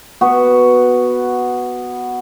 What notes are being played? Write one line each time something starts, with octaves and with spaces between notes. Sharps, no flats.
B3 F#4